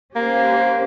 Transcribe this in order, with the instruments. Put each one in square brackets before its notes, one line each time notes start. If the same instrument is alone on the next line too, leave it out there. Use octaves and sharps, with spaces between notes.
[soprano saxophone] A#3 [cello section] C#4 G4 C5